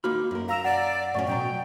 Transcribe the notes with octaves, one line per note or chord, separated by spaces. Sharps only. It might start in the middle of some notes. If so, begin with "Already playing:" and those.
A#3 D#4 F#4 B5 F6
F#2 A#4
F5 A#5 E6 E7
D5 F#5 E7
A2 F#3 C#4 D5 F#5 C#6
B2 F#3 G5 A#5